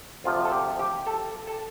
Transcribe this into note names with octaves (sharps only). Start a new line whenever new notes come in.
D2 C3 F3 F4
A4
G4
G4
A4
A4